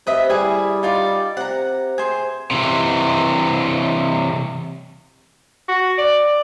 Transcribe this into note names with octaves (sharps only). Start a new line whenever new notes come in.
C3 B4 D#5 E5
G3 E4 G#4
D#4 F4 D5
C3 F#5 A#5
G#4 C5
C3 E3
F#4
D5